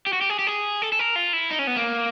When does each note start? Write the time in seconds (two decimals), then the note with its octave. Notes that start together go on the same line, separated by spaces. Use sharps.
0.06 G4
0.13 F#4
0.21 G4
0.30 G#4
0.39 G4
0.47 G#4
0.82 A4
0.92 A4
0.99 A#4
1.16 F4
1.33 E4
1.51 D#4
1.59 C#4
1.67 B3
1.76 A#3